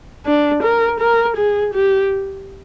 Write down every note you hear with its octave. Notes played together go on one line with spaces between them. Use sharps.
D4
A#4
A#4
G#4
G4